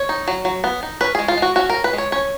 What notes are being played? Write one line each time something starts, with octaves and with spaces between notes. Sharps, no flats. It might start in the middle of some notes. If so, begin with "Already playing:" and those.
Already playing: C#5
D#4
F#3
F#3
B3
D#4
C#4 B4
G#3 G#4
F4
G#3 F#4
C#4 F#4
A#4
C#4
B4
G#3
C#5
C#4 C#5